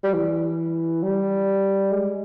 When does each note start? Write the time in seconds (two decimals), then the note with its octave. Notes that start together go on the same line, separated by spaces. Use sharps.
0.04 G3
0.14 E3
1.03 G3
1.92 G#3